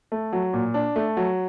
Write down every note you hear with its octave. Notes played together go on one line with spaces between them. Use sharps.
A3
F#3
A#2
D4
A3
F#3